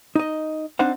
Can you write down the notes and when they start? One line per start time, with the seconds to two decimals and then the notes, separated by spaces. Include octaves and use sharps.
0.15 D#4 D#5
0.79 C4 D4 D#4 C5 F5 F#5